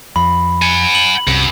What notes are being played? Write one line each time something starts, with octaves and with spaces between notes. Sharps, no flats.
F2 B5
F#5 G#5
F#7
C2 F#2